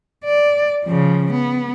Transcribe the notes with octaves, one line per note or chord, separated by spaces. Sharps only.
D5
C#3 F3
B3